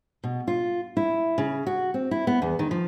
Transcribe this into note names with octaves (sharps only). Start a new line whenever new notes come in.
B2
F4
E4
C#3
F#4
C4
E4
B3
E2
D#3
F3